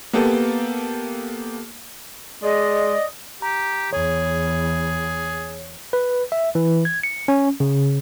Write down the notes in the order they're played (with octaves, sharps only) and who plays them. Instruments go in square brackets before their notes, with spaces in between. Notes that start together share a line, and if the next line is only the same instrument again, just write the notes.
[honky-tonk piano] A#3 B3 G4 A4
[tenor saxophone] G#3 [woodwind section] D5 D#5
[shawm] G4 [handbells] A#5
[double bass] E2 [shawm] G#4 [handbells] C#5
[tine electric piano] B4
E5
E3
G#6
C#7
C#4
C#3